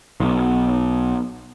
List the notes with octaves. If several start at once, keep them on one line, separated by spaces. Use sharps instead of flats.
B1